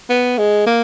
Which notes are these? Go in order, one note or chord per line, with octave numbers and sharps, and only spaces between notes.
B3
G#3
A#3